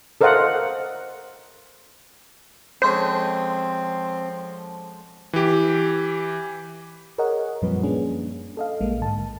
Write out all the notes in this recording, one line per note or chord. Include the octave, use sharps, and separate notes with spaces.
A4 A#4 C5 D#5 F5 F#5
D3 F3 G#3 C4 C#4 C5
E3 G4
G#4 A#4 C#5 D#5 F#5
F#2 A#2 F3 G3 C4 B4
A#3 C#4 D4 G#4
A4 D#5 F5
A#1 G#3 A#3
G#2 D3 A5